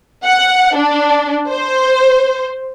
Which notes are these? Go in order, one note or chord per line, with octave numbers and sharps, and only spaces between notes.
F#5
D4
C5